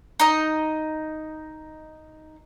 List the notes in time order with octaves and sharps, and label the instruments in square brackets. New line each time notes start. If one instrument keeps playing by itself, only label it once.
[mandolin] D#4 D#5